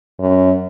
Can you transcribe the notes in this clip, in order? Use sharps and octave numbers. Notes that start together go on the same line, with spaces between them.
F#2